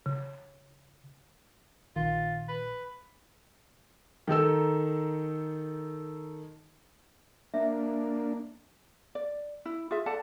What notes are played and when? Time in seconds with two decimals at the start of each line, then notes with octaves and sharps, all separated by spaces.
0.06 C#3
1.96 A#1 D#3 F4
2.48 B4
4.27 D#3 D#4 A4 E6
7.54 A#3 D4 E5
9.15 D5
9.65 E4
9.91 F4 G#4 E5
10.06 A4 D5 F#5 A5